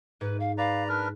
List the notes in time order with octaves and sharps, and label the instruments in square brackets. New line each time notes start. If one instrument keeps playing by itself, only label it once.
[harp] G#2 [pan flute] B4
[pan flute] F5
[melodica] B4 D5 A#5 [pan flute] F5
[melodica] D4 A#4 B4 [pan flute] F6